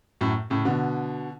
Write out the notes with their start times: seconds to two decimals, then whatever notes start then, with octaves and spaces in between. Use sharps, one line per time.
0.21 F#2 A2
0.50 A2 C#3
0.65 B2 D3